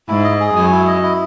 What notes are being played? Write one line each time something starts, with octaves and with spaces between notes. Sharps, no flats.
G#2 E4
D#5
G#4
F#2 G#5
E4
D#5
E4